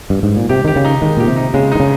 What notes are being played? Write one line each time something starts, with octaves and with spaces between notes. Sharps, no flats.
G2
G#2
A#2
C3 G4
D#3 G4
C#3
D#4
D#3 G#3
A#2 G4
C3
D#4
C#3 G#3
D#3 D#4
C#3